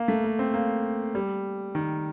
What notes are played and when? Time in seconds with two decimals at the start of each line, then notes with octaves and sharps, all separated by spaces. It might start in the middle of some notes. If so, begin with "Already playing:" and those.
Already playing: A#3
0.08 A3
0.24 A#3
0.39 C4
0.54 A#3
1.15 G3
1.75 D#3